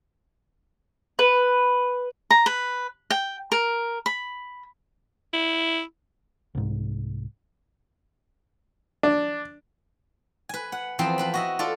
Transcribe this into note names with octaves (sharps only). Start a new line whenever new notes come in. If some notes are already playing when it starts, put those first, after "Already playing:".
B4
A#5
B4
G5
A#4
B5
E4
C2 G#2
D4
B4 G#5
F#5
E2 F3 C4 B4 C5 C6
F3 B4 B5
F#4 D#5 E5
F4 A4 D5